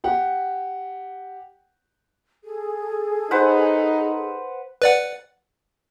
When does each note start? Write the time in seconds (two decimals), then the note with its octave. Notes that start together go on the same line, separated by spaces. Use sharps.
0.04 G4 F#5
2.44 G#4 A4
3.31 D#4 B4 C5 F#5
4.82 B4 D5 F#5